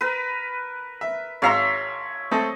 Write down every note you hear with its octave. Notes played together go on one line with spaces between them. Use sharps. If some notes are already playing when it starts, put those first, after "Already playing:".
A#4 B4
E5
G#1 C#5 E5 F5 A#5 C6
A3 C4 A4 D#5